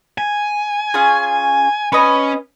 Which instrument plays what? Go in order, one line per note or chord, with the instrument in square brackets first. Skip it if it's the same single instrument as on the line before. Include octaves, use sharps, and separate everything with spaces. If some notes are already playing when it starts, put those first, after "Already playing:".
[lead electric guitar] G#5
[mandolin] C#4 F4 G#4
[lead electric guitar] C#4 [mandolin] B4 D#5